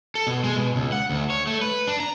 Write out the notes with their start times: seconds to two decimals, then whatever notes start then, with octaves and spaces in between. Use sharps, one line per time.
0.15 A4
0.27 B2
0.44 G#3
0.56 B2
0.76 C#2
0.92 F#5
1.09 D2
1.30 C#5
1.47 A3
1.61 B4
1.87 D4
2.00 A#5